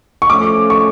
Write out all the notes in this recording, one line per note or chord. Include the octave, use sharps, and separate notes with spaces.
C#6
F3 A3 C#4 D6
C#6